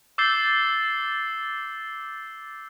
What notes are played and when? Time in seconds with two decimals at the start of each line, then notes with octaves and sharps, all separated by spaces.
0.18 D6 E6 G6 A6 C7 G7